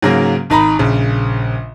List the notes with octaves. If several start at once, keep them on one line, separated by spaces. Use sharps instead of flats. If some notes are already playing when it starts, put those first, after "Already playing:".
G#2 C#3 F#3 G#3 A#3
G#1 D#4 A#5 B5
A#1 C#3